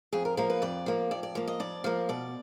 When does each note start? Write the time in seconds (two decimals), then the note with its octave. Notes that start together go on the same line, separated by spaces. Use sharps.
0.12 F2 G#4
0.25 A#4
0.37 F3 A#3 A#4
0.50 B4
0.62 F2 D5
0.86 F3 A#3
1.11 F2 D5
1.23 D5
1.35 F3 A#3
1.48 D#5
1.60 F2 D5
1.84 F3 A#3
2.09 B2 D5